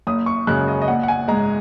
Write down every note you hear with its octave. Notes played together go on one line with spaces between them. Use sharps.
F#1 D#6
C#6
F#2 C#3 G#3 F#6
D#5
D#5
A#1 F#5
F#5
G#5
G#2 G#3 A#5